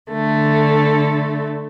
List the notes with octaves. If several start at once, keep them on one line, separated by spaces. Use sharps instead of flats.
D3 A3 A4